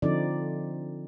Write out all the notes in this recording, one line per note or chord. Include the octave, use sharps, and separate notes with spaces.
D3 F3 C4 D#4 D5